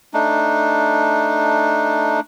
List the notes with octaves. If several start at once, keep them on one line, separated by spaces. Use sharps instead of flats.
A3 D4 D#4